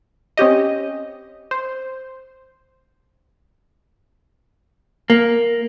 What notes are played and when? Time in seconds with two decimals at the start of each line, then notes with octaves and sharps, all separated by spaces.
0.37 C4 C#4 G4 D#5
1.51 C5
5.10 A#3